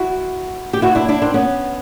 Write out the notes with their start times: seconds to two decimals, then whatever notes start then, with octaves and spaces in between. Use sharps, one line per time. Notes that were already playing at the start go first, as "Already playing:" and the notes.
Already playing: E4 F#4
0.73 G4
0.82 E4 F#4
0.95 D4 E4
1.08 D4 E4
1.22 C4 D4
1.34 B3 C#4